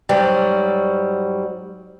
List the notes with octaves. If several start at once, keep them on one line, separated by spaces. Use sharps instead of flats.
G#2 F#3 G3